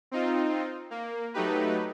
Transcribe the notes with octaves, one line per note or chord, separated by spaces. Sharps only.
C4 D#4 F4
A#3
F#3 A3 D#4 G4 B4